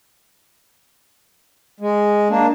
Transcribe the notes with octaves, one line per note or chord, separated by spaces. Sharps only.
G#3
A#3 D4